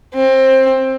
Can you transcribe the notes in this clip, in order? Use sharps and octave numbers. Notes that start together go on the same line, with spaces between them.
C4